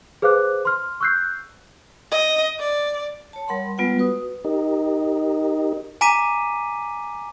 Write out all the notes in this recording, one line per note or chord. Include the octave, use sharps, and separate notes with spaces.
G#4 B4 C5 F5 D6 F#6
C6 F6
C#6 E6 F#6 G6 C7
D#5
D5
C#5 A5
G3 A#4 F#5 B5 C6
G3 G#3 B3 F4 B4 F#5
F#4 B4 D#6
D#4 G4 A#4 D#5
G#5 A#5 D6 B6 D#7